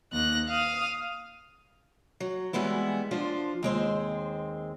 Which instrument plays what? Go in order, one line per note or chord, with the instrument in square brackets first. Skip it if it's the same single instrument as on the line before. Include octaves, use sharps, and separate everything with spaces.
[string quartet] D#2 F#6 A#6
F5 D#6
[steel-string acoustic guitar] F#3
E3 G3 G#3 B3 E4
F3 D4 F4 C5
D#2 G#3 C4 C5